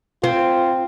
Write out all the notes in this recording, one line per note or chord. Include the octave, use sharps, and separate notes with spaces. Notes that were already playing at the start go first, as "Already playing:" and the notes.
C4 F4